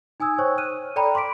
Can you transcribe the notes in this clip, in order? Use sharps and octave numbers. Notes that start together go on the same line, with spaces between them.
D#4 G#5 D#6 E6 G#6
C5 C#5 G5 C#6
F6 F#6 D#7
A4 D5 G5 A#5 B5
C6 D6 B6 D7